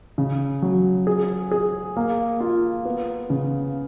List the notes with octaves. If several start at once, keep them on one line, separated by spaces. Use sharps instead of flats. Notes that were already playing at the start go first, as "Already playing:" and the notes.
C#3
F#3
G#4
G#4
A#3
F4
B3
C#3